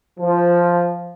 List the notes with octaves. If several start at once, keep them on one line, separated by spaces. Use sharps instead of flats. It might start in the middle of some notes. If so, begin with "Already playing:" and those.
F3